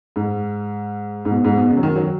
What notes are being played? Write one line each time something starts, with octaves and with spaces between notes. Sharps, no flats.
G#2
G#2
B2
G#2
B2
C#3
F#3
D#3
F#3